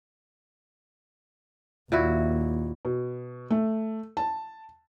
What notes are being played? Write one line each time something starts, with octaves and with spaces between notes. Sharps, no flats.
D#2 A#2 E4 F#4
B2
A3
A5